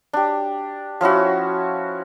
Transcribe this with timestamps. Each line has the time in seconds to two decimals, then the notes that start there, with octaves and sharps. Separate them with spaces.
0.13 D4 G4
1.01 F3 C#4 E4 F#4